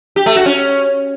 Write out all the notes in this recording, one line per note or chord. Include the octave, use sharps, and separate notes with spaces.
G4
A3
F#4
C#4